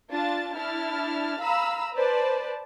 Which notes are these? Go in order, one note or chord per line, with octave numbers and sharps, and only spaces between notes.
D4 F4 A5 A6
D4 E4 A5 F6
F5 A#5 B5 E6
B4 C5 D5 A5